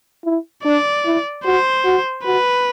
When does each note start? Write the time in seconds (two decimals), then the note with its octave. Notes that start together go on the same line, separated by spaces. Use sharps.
0.25 E4
0.64 D4 D5
1.05 E4
1.45 F#4 C5
1.85 F#4
2.24 F#4 B4